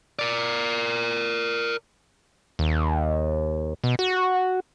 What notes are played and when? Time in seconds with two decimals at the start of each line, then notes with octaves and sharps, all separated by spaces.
0.19 A#4 D5
2.59 D#2
3.84 B2
3.99 F#4